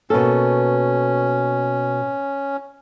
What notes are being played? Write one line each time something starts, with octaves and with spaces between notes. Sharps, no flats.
B2 A#3 C#4 A4